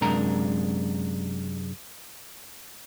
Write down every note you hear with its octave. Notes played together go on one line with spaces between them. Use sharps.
F#2 C3 G#3 D4 A#4 A#5